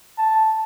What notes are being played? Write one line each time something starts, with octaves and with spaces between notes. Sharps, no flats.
A5